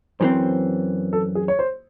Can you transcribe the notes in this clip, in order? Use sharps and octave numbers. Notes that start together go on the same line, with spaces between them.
F#2 E3 C4 C5
A4
G#4
C#5
C5